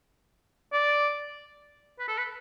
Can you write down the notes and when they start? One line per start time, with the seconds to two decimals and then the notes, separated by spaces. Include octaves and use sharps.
0.73 D5
2.00 B4
2.08 A4
2.18 B4